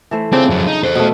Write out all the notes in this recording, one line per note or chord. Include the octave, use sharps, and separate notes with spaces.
E3 A3 C5
C#3 C4 D4 F4
F2 F#3
D#4
A4 C5
B2 A3